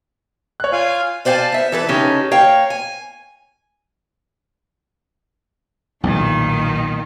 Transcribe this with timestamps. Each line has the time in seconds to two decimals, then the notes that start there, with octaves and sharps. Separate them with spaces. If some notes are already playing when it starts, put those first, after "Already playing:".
0.60 C#5 F#6
0.72 F4 F5 G#5
1.25 C5 D5 F5 F#5 G#5 A5
1.52 B3 E5
1.72 E3 A4 B4
1.89 C#3 C#4 D#4 G4 A4
2.31 A#3 C#5 F5 G5
2.70 G#5
6.03 B1 E2 A#2 D#3